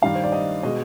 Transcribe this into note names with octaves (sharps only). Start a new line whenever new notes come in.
G2 D#3 G3 F5
C5
D5
D#5
B2 G#3 D#5